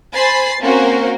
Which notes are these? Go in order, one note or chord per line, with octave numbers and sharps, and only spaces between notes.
C5 G#5 B5 A6 C7
A#3 C4 C#4 F#4 A#4 C5